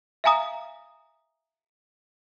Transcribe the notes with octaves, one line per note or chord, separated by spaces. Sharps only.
E5 F5 G#5 A#5 D#6